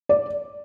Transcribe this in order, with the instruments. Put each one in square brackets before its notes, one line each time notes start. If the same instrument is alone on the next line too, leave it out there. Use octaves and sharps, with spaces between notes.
[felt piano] D5